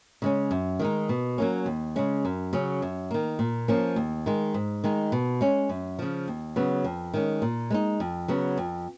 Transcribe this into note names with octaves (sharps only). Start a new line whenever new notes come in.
C#3 G#3 C#4
F#2
D#3 G#3 D#4
B2
F#3 A#3 C#4
D#2
C#3 G#3 C#4
F#2
C#3 F#3 C#4
F#2
D#3 A#3
A#2
F3 A#3 C#4
D#2
D#3 G#3
G#2
D#3 G#3 D#4
B2
G#3 C#4
F#2
C#3 F3
D#2
C#3 F#3 B3
F2
D#3 G#3 C#4
A#2
G#3 B3 D#4
F2
C#3 F#3 B3
F2